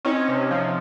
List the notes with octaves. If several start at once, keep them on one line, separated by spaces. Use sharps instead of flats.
C4 C#4 D#4
C3
F3